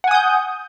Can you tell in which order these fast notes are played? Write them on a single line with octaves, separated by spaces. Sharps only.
F#5 G#5 D#6 G6